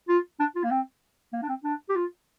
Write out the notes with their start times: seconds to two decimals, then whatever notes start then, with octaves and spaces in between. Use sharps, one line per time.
0.08 F4
0.39 D4
0.56 F4
0.64 A#3
0.71 C4
1.33 A#3
1.43 D4
1.49 C4
1.64 D4
1.89 G4
1.95 F4